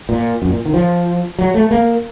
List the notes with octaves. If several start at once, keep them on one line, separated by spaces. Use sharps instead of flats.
A#2
F#2
A#2
D#3
F3
F#3
A3
A#3